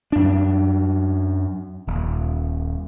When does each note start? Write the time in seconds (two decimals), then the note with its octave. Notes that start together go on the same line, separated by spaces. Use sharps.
0.12 F#2 D4
1.87 D#1